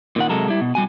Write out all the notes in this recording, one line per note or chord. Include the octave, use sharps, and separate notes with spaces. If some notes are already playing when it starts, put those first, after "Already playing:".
A#2 D#3 F#5
C3 F#3 G#3 A4 A#4
G3 E4
B2
G3 F#4 G#5